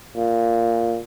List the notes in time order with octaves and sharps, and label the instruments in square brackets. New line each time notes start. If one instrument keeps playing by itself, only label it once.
[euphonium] A#2